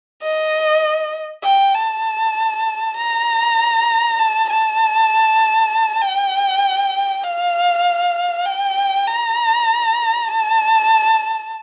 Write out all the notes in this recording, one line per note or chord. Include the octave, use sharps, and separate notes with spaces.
D#5
G5
A5
A#5
A5
A5
G5
F5
G5
A#5
A5